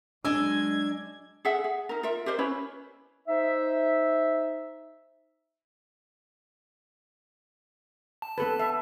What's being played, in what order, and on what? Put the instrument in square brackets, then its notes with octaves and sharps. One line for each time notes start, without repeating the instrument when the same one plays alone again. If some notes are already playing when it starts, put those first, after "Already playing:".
[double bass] F#3 G#3 [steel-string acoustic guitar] D4 D#5 G#5 [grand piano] E6 [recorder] G#6
[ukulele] G#4 A4 E5 F#5
G#4
D#4 A#4
F4 A#4 E5
G4 A#4 C5 D#5
C#4 E4 B4 C#5
[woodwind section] D#4 C5 E5
[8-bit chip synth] A5
[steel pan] B3 A4 B4
E5